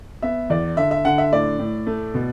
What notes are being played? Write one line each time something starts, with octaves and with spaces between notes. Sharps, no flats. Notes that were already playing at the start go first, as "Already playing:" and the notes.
B3 E5
E2 D5
D3 E5
E5
D3 F#5
E5
A2 D5
A2
A3
B2